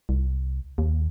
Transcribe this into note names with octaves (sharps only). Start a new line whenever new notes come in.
C2
D#2